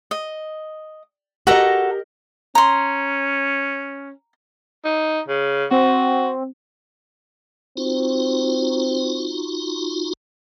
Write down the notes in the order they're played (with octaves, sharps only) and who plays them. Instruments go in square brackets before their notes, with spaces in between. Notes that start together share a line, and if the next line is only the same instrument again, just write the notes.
[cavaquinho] D#5
[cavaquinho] F#4 A4 A#5 [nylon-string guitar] G4 A#4 D#5
[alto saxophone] C#4 [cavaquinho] A#5 C6
[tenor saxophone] D#4
C#3
[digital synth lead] C4 [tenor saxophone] F#4
[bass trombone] C4 [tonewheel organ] D#4 F4 F#4